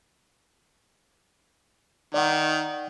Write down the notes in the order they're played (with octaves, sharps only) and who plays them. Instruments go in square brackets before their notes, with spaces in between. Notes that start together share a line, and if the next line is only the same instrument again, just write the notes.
[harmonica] D#3 [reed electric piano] D5 F#5